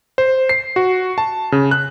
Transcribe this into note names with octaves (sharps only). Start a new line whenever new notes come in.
C5
C7
F#4
A5
C#3
F#6